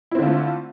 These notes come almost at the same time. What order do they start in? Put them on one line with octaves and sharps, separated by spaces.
E4 C4 D3 F4 A3